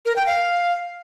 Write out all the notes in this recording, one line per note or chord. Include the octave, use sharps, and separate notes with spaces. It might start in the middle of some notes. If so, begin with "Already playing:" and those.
A#4
G5
F5